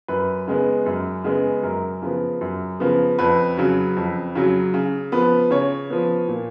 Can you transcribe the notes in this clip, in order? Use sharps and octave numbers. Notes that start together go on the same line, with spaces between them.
F#2 B4
C#3 G#3 B3
F#2
C#3 G#3 B3
F#2 A#4
C#3 F3 B3
F#2
C#3 F3 B3
F2 B4
C#3 F#3
F2
C#3 F#3
C#3
F3 B3 B4
C#3 C#5
F3 B3
A#2